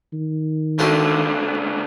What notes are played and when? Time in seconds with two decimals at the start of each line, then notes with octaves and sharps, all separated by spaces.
0.14 D#3
0.79 C#2 D3 A3 C4 F#4